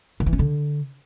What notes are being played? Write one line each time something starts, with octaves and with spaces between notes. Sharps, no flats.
D#3
E3
C#4
D3